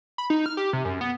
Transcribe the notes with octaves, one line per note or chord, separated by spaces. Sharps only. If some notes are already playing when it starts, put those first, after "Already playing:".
B5
D#4
F6
G4
C3
F#2
B3